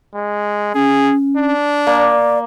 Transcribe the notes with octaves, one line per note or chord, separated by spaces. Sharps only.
G#3
C#4 G#4
D4
A#3 D5